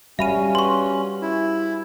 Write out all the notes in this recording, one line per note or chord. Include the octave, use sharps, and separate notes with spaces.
G3 C#4 F#4 E5 F5 B5 D#7
B4 C6 C#6
E4